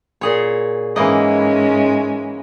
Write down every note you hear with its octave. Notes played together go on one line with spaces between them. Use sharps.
A#2 G#4 C#5
G#2 E3 G#3 A#3 C#4 D#5